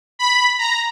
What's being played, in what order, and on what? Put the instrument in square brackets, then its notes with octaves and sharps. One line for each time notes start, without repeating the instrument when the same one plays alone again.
[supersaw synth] B5
A#5